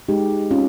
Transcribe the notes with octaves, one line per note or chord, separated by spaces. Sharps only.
G#3 D#4 G4
C4 C#4 F4